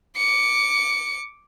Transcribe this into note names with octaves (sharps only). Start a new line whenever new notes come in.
D6 C#7